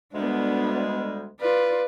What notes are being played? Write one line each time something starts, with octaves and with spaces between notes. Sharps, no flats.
D2 G3 G#3 B3 D4
F4 B4 D5